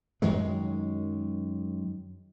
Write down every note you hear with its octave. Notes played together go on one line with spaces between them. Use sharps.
F#2 D#3 F#3 G#3